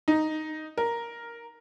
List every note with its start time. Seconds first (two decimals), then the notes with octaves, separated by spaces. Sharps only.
0.08 D#4
0.78 A#4